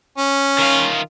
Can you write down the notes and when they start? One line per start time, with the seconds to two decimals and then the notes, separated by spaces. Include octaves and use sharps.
0.18 C#4
0.58 D#3 F4